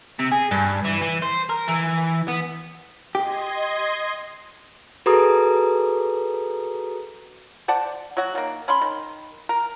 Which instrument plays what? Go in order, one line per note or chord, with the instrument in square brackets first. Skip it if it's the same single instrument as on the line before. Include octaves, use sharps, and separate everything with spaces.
[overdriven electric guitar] C3
G#4
G2
E3
E3
C5
A#4
E3
B3
[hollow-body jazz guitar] G4 [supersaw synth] D#5 C6 G#6
[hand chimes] F#4 G#4 A4 B4 A#5 D#6
[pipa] C5 D5 F#5 A5
F#3 F#4
D#3 A#3
C#4 B5 C6
D#3
A#4